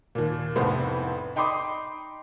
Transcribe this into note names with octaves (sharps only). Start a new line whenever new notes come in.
D#2 A#2
F1 C2 A2 B3 C5
D#4 G5 B5 C6 D6 D#6